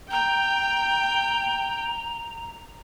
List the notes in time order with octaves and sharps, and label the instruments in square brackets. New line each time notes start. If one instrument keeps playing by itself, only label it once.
[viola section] G5 [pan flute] A#5